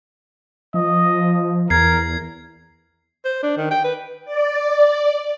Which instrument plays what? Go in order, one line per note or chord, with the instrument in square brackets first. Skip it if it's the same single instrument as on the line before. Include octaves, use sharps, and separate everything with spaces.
[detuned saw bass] F3 [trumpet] D#5
[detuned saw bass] E2 [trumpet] A#4 [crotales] G#6 C7
[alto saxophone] C5
D4
D#3
G5
B4
[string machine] D5